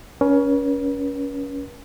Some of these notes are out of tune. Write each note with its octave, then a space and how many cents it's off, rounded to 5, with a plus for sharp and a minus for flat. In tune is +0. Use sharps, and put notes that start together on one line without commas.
C#4 +20 B4 -45